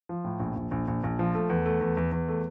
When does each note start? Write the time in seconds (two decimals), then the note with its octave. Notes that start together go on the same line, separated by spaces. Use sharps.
0.09 F3
0.24 A2
0.40 A#1
0.56 A#1
0.71 A#1
0.88 A#1
1.03 A#1
1.19 F3
1.35 A3
1.50 E2
1.66 A3
1.81 E2
1.97 E2
2.12 E2
2.28 A3